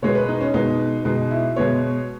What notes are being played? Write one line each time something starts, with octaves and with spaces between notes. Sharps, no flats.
B2 G#3 B3 C#5
B4
D#4
C#4
B2 G#3 B3 D#4
B2 G#3 B3 D#4
E4
B2 G#3 B3 C#5